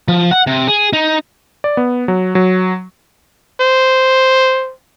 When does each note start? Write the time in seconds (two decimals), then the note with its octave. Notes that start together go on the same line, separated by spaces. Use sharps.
0.08 F3
0.31 F#5
0.47 C3
0.68 G#4
0.93 D#4
1.64 D5
1.77 B3
2.08 F#3
2.35 F#3
3.61 C5